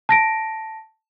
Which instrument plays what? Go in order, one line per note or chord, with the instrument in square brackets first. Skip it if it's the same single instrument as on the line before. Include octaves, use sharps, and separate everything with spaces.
[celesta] A5 A#6 D7